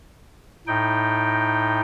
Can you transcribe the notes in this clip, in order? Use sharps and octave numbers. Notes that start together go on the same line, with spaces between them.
A2 D#4 G5